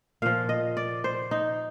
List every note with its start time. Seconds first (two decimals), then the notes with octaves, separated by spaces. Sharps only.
0.22 A#2 F3 F5
0.49 D#5
0.77 D5
1.04 C5
1.31 D#4